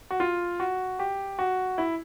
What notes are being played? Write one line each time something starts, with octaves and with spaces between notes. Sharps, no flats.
F#4
F4
F#4
G4
F#4
E4